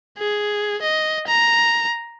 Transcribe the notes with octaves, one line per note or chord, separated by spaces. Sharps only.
G#4
D#5
A#5